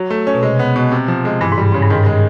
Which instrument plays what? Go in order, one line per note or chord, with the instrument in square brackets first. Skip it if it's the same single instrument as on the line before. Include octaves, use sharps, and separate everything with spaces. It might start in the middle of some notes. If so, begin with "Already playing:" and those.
Already playing: [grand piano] F#3
A3
C#4
[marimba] B2
[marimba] C3 [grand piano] G#3
[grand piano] B3
B2
C3
F3
G#3
[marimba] G2 [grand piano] E3
[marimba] G#2
[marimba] G2 [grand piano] G3
[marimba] G#2 [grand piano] C#3
[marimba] G2
[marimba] G#2 [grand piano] D#3
[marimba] G2 [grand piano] G#3